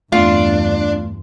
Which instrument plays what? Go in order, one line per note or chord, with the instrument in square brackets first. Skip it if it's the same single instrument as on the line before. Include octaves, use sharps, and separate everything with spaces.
[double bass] E2 G2 [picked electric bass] A3 B3 C4 [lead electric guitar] D4 [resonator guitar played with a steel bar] F4